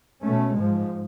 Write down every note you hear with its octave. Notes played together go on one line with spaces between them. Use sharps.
B2 A3 C#4
G#2 F3 G#3